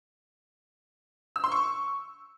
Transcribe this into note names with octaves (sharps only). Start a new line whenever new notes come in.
E6
C6
C#6